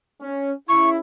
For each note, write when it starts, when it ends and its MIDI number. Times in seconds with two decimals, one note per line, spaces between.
0.22 0.51 61
0.69 0.99 49
0.69 0.99 64
0.69 0.90 85